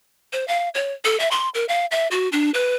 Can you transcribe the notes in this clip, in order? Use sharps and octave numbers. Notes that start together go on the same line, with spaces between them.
C5
F5
C#5
A4
E5
C6
A#4
F5
E5
F#4
D4
B4